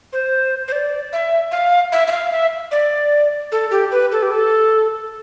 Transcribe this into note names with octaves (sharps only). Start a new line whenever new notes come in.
C5
C5
D5
E5
F5
E5
E5
F5
E5
D5
A4
G4
B4
A4
G4
A4